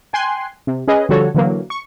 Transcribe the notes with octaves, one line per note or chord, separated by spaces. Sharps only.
G5 G#5 C6 F#6 C7
C3
C#4 G#4 B4 D#5
D3 F3 G3 F#4 A4 C#5
D3 E3 F#3 A#3
C#6